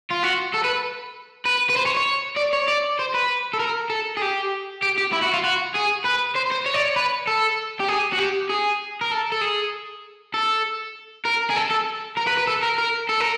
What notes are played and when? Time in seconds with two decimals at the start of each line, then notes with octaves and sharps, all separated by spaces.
0.11 F4
0.24 F#4
0.54 A4
0.64 B4
1.46 B4
1.70 B4
1.76 C5
1.86 C#5
1.97 C#5
2.37 D5
2.53 C#5
2.68 D5
2.99 C5
3.14 B4
3.54 A4
3.60 A#4
3.90 A4
4.17 G#4
4.22 G4
4.83 G4
4.98 G4
5.13 E4
5.23 F#4
5.34 F4
5.44 F#4
5.74 G#4
6.04 B4
6.35 C5
6.51 C5
6.66 C#5
6.74 D5
6.82 C#5
6.96 B4
7.27 A4
7.80 G4
7.88 G#4
8.13 F#4
8.19 G4
8.50 G#4
9.01 A#4
9.11 A4
9.32 A4
9.41 G#4
10.34 A4
11.25 A#4
11.50 G#4
11.56 A4
11.70 A4
12.17 A#4
12.27 B4
12.37 B4
12.47 A4
12.63 A#4
12.78 A#4
13.09 A4
13.20 A#4